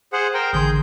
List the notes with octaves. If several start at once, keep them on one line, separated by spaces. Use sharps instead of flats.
G#4 C5 F#5
A#4 C5 G5
A1 D3 G#4 C6 G6